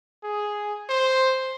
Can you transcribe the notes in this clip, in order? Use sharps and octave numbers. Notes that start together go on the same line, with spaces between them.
G#4
C5